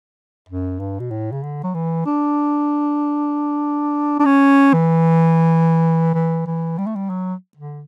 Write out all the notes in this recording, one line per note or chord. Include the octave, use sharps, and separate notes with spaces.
F#2
G2
B2
A2
C#3
D3
F#3
E3
D4
D4
C#4
E3
E3
E3
G3
A3
G3
F#3
D3